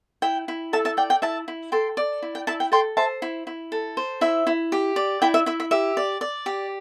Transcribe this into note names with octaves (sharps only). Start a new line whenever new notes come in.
E4 G5
E4
A4 E5 A5
E5 A5
D5 G5
G5
E4 E5 A5
E4
A4 G5 C6
D5
E4
G5
E4 E5 A5
G5
A4 G5 C6
C5 E5 A5
E4
E4
A4
C5
E4 E5
E4
G4
D5
E4 G5
E5
E4 E5
E5
G4 E5
D5
D5
G4